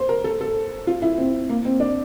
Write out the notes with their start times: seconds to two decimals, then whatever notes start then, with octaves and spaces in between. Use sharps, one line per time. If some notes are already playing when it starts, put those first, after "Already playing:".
Already playing: C5
0.09 A#4
0.24 A4
0.41 A4
0.87 F4
1.02 E4
1.18 C4
1.49 A#3
1.65 C4
1.80 D4